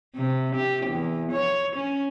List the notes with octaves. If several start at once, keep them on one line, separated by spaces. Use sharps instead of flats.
C3
G4
E2
C#5
C#4